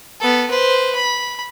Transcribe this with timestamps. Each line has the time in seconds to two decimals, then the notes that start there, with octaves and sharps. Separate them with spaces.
0.21 B3 A4
0.50 B4 C5
0.95 B5